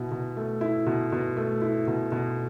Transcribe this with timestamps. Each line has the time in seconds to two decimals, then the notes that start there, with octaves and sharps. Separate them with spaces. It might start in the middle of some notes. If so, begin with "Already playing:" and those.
Already playing: B2 E4
0.11 B2
0.37 A3
0.61 E4
0.86 B2
1.12 B2
1.37 A3
1.61 E4
1.87 B2
2.12 B2